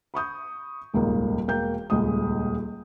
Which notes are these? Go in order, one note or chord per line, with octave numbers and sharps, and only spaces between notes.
B5 C#6 D#6 G6
D#1 G#1 C#2 A#3
E1 A#3 G5 G6
D#1 C#2 G#3 D#6